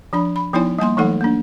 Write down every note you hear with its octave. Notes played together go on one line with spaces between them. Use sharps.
F3 D4 B5
B5
F3 B3 D#4 E4 C#5 G#5
G3 A#3 G#5 C6
E3 F#3 A3 D#4 A4 F#5
A#3 D4